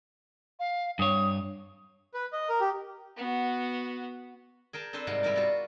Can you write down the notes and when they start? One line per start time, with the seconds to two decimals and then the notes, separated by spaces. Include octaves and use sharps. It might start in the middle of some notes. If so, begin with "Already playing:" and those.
0.60 F5
0.99 G2 C#5 D#6
2.14 B4
2.33 D#5
2.49 A#4
2.60 G4
3.17 B3 F#4
4.73 G#4 A#4 G5 A5
4.93 C4 D4 A4 B4 C5
5.07 G#2 C3 G3 F5 F#5 A#5
5.23 G3 E4 A#4 D5
5.36 B3 F4 F#4